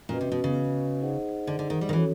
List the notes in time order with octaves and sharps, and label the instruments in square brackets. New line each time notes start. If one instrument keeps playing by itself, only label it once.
[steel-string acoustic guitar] A#2 [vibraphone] C#4 F#4 B4 D#5
[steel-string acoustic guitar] C3
B2
C#3
[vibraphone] D#4 G#4 C5 D#5 F#5
[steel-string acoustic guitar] D3
D3
D#3
G3
D#3
[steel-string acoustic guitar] E3 [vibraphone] C#4 F#4 A4 C#5